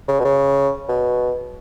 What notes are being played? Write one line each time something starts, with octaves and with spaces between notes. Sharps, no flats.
C#3
B2
C#3
B2